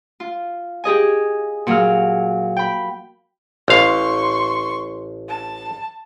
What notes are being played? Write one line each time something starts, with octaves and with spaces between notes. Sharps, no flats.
F4
G4 G#4 D#5 G#5
A#2 F#3 G#4 F5 F6
G5 B5
A1 F5 C6 C#6
A5